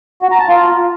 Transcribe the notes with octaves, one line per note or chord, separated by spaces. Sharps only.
F#4
A#5
A5
F4